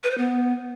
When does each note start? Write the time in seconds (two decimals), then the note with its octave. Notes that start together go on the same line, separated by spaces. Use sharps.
0.04 B4
0.11 C5
0.18 B3